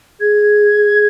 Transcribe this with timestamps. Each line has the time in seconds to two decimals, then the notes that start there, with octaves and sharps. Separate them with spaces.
0.20 G#4 G#6